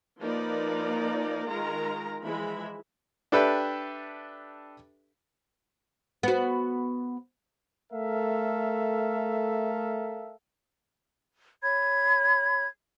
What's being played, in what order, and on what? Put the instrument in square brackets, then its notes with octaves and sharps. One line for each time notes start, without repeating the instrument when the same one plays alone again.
[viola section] F3 A#3 D#4 A#4 B4 D5
D#3 G#3 F4 A#4 A#5
E3 F3 G#3 E5 B5
[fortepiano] D4 G4 A4 B4 E5 G5
[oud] B3 F#4
[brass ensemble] A3 A4 A#4 E5 F5
[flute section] C#5 B5 G#6